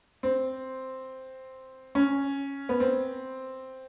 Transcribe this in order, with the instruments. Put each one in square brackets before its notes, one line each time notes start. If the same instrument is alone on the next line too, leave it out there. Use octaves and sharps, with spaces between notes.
[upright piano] C4
C#4
B3
C4